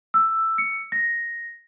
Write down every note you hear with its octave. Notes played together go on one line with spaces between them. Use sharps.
E6
C#7
A#6